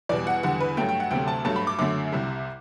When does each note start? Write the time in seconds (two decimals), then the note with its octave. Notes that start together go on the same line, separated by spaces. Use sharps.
0.09 E2 B2 G3 D5
0.27 F#5
0.43 E2 D3 G3 F#5
0.60 B4
0.77 G2 F#3 A3 G5
0.89 G5
1.00 F#5
1.11 D2 C3 F#3 A3 G5
1.28 A5
1.45 G2 F#3 A3 A5
1.56 B5
1.67 D6
1.79 F#2 D3 F#3 A3 D6
2.12 C2 C3 G3